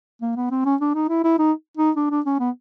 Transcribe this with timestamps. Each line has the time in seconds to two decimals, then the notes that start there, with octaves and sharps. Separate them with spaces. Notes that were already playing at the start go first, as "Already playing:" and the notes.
0.21 A#3
0.36 B3
0.51 C4
0.65 C#4
0.81 D4
0.94 D#4
1.09 E4
1.24 E4
1.38 D#4
1.77 D#4
1.96 D4
2.10 D4
2.26 C#4
2.39 B3